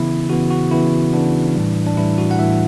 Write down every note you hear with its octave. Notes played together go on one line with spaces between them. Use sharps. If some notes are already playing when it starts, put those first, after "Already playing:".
Already playing: C#3 E3 B3 E4
C#3 E3 B3 F#4
F#4
C#3 E3 B3 E4
C#3 E3 B3 D4
A2 E3 G3
D4
A2 E3 G3 E4
F#4
F#5
A2 E3 G3 E5